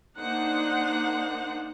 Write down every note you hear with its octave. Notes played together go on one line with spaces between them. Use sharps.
A#3 D4 D#4 C5 F#5